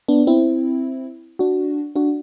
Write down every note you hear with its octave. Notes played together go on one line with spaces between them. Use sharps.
B3 D4
C4 E4
D4 F#4
D4 F#4